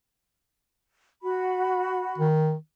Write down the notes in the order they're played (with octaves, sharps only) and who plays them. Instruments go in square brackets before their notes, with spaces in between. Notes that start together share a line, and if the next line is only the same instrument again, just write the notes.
[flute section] F#4 B5
[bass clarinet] D#3